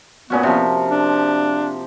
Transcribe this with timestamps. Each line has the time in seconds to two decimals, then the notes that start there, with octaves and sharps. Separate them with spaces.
0.30 A#2 B3 C#4 F#4
0.43 C3 F3
0.88 D4